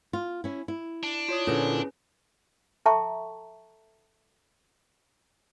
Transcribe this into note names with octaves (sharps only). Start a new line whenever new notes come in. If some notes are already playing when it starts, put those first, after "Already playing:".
F4
C#4 E4
E4
D4
F4 C#5 D#6
A#2 D3 C#4 E4 G#4 B4
A4 E5 G5 A5 A#5 C#6